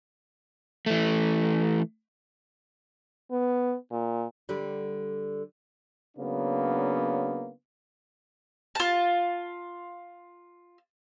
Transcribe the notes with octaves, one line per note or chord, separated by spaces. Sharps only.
E3 A3
B3
A#2
D3 G3
C#3 F#3 A#3 B3 D4
F4 A5